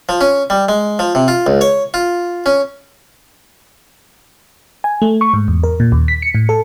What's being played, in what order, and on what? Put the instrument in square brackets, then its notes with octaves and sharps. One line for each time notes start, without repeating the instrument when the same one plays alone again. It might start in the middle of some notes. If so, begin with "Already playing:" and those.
[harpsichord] F3
C#4
G3
G#3
F3
C3
F4
C#2
C#5
F4
C#4
[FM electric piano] G#5
A3
C#6
G#2
E2
A#4
A#2
D#2
B6
C#7
A2
A4